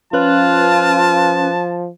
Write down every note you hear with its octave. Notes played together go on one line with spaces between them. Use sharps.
F3 C#4 F4 B4 A5 F#6